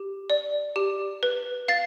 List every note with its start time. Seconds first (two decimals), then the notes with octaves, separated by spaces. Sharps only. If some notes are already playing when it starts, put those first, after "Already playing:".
Already playing: G4
0.30 D5
0.76 G4
1.23 B4
1.68 F5 A6 C7